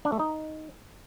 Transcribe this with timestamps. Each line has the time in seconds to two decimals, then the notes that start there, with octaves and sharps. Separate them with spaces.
0.05 D4
0.12 A3
0.19 D#4